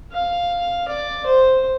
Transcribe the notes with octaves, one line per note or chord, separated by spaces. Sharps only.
F5
D5
C5